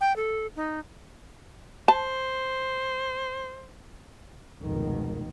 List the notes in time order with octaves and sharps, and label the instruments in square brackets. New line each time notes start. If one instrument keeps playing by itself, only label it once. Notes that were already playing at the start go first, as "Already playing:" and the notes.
[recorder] G5
A4
D#4
[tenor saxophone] C5 [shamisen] A5
[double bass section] F1 C#2 B2 D#3